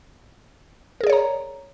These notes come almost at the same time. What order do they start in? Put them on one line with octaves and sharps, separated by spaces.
A#4 G#4 D5 C#5 A#5